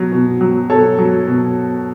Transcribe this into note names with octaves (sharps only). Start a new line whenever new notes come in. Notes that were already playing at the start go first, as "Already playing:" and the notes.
Already playing: B2 F#3
B2
F#3
B2 A4 C#5
F#3
B2